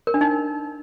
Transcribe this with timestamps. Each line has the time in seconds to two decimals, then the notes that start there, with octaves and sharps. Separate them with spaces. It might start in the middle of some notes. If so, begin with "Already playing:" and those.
0.07 A#4
0.14 D4
0.21 D#4